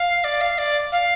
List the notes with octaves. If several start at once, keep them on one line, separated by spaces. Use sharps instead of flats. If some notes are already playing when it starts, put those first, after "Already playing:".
Already playing: F5
D5
F5
D5
F5